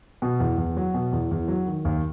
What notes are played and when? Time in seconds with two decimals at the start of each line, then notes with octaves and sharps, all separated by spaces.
0.22 B2
0.40 E2
0.58 E2
0.77 F#3
0.94 B2
1.12 E2
1.31 E2
1.48 F#3
1.67 D#3
1.85 D#2